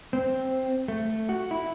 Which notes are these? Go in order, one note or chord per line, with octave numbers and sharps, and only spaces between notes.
C4
A3
F#4
E4